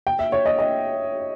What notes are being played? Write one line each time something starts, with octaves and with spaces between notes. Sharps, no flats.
G5
E5
C#5
D#5
D#5